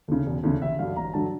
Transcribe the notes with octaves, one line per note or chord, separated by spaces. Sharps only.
D2 C#3
E1
D2 C#3
A1 E5
G2 D3 F#3 F5
A1 A#5
G2 D3 F#3 A5